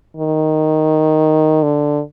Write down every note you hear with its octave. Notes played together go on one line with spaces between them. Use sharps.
D#3
D3